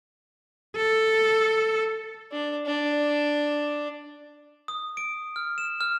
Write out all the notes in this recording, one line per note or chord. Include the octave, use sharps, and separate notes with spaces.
A4
D4
D4
D#6
D7
F6
E7
F6